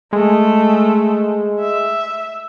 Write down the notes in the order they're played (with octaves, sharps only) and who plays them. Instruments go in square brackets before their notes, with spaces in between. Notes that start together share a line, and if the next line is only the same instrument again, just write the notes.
[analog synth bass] G#3 [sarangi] A3
[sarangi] E5